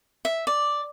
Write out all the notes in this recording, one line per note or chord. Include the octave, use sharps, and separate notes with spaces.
E5
D5